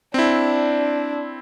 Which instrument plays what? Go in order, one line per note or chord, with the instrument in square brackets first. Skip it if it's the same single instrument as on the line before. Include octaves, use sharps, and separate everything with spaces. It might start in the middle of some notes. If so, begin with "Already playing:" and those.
[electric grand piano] C4 E4 [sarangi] D4